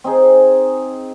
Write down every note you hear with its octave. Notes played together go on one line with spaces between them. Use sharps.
C4 D#4 G#4